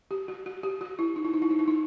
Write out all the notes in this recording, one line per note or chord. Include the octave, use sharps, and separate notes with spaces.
G4
F#4
F#4
G4
F#4
E4
D#4
E4
D#4
E4
D#4
E4
D#4